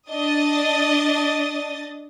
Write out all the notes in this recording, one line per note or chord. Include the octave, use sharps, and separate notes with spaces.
D4 D#5 D#6 A6